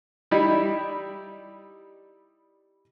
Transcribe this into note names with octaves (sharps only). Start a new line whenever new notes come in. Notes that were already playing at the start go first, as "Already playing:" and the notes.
G3 D#4 E4